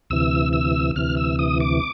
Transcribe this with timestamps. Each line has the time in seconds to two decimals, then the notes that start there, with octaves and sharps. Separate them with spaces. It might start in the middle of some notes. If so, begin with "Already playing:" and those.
0.10 D2 C3 E3 E6
0.53 E6
0.96 D2 C3 E3 F6
1.17 E6
1.39 D#6
1.60 D6